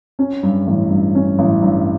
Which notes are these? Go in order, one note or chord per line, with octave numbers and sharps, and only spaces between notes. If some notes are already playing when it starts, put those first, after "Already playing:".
C#4
G2
A1
G2
C#4
A1
G2